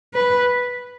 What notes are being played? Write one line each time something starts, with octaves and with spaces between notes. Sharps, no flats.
B4